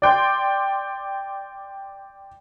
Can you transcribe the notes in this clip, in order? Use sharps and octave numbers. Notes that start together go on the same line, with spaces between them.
D5 G5 C6